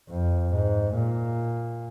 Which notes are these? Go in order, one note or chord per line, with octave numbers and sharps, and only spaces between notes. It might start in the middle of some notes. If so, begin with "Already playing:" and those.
F2
G#2
A#2